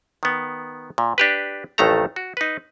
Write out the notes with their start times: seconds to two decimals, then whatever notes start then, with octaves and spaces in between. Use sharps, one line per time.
0.23 D#3 B3
0.98 A#2
1.18 D4 G4 B4
1.78 A1 F2 D#3 A3 A4 A#5
2.16 F#4
2.37 D#4 B4